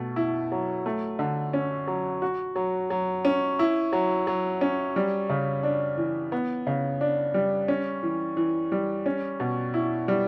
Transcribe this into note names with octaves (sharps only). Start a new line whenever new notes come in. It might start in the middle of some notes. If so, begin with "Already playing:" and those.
Already playing: B2 A3
E4
F#3
A3
D3
C#4
F#3
F#4
F#3
F#3
C#4
E4
F#3
F#3
C#4
G3
C#3
D4
E3
B3
C#3
D4
G3
C#4
E3
E3
G3
C#4
B2
E4
G3